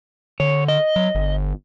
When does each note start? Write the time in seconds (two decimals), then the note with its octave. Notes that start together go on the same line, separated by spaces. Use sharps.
0.40 D3 C#5
0.68 D#5
0.96 F#3
1.15 G1